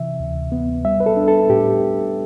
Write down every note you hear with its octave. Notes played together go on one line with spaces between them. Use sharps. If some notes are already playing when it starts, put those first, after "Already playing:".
Already playing: C3 E3 E5
D2
B3
G3 E5
B4
A4
D4
A4
A2 G4